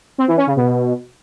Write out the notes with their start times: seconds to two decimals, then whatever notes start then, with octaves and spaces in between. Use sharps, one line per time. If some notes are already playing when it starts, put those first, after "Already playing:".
0.18 C4
0.28 E3
0.37 C#4
0.47 C#3
0.56 B2